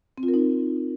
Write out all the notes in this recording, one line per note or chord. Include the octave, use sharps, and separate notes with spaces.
C4
F4
A#4
D#4